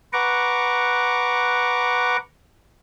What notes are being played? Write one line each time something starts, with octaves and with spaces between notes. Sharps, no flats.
B4 F#5 A#5 C#6 D6